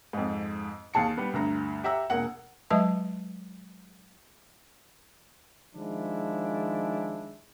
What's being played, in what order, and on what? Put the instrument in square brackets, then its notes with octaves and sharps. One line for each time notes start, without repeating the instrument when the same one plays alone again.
[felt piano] F2 G#2
D#2 G#4 A5 C7 C#7
G3 B3
D2 G2 A#5
G4 E5 F#5 A#5 E6
E1 A#3 F#5
[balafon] F#3 G#3 B4 D#5 E5 A5
[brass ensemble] D#3 F3 G#3 D4 E4